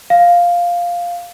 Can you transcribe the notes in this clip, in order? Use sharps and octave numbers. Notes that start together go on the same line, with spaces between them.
F5